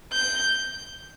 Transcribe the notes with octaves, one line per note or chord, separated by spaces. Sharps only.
G6